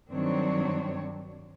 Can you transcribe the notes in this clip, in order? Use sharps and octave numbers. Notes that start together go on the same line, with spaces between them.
G2 D#3 F#3 C4 D4 C#5